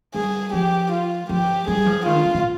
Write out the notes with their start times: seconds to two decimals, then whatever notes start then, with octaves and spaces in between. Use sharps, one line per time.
0.14 G3 G#4
0.53 F3 G4
0.91 F4
1.29 F3 G4
1.67 G3 G#4
1.86 F3
2.06 D#3 F4
2.15 D3
2.25 D#3
2.34 B2